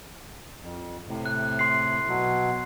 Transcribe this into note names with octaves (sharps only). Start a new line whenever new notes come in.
F2
A2 C3
F#6
C6 C7
B2 F#3